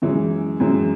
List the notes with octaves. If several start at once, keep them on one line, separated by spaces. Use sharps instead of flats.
F#2 E3 G#3
F#2 E3 G#3